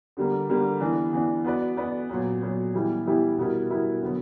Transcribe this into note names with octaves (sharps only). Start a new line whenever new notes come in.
D3 G3 A#3
D3 G3 A#3
E3 B3 D4
E3 B3 D4
B3 F#4 B4 D5
B3 F#4 B4 D5
A#2 F#3 B3
A#2 F#3 B3
E3 G3 B3 E4 G4
E3 G3 B3 E4 G4
B2 G3 B3 E4 A#4
B2 G3 B3 E4 A#4
D3 F#3 B3